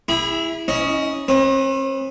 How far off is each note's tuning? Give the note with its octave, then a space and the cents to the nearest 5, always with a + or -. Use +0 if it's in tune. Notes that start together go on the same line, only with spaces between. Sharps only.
E4 +0 G#4 -35 B5 -35
C#4 +0 E4 -40 D#5 +0
C4 +45 B4 +15 D#6 +0